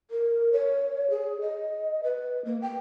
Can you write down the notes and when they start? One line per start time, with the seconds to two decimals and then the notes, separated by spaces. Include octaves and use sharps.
0.11 A#4
0.52 C#5
1.10 G#4
1.41 D#5
2.04 B4
2.45 A#3
2.62 G5